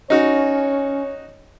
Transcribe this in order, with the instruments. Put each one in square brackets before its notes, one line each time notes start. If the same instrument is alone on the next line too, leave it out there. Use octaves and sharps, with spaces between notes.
[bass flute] C#4 [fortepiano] D#4 F#4 [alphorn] C#5